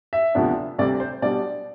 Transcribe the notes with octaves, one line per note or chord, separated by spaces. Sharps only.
E5
D2 C3 F3 B3 D4
D2 C3 G3 C4 D5
C5
B2 G3 D4 D5